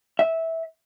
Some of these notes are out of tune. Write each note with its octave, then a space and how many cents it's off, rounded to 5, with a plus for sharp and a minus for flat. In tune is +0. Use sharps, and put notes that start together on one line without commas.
E5 -15